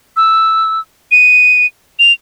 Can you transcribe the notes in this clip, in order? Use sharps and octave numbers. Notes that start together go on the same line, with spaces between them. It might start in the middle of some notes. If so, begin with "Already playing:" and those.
E6
D#7
F7